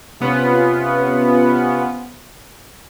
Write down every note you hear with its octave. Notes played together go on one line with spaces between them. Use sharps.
C3 B3 C#4 F4